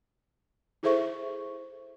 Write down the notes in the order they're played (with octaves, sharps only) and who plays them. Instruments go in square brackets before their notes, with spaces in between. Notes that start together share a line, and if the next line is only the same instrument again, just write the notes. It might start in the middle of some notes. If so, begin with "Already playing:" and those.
[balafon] E4 G#4 A4 C5 E5 C#6